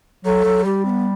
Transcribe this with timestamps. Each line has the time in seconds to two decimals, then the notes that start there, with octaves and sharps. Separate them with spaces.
0.25 F#3 A4
0.45 F#3
0.65 G3 G4
0.85 C4
0.90 B3